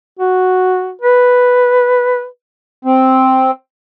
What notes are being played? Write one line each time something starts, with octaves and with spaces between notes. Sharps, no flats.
F#4
B4
C4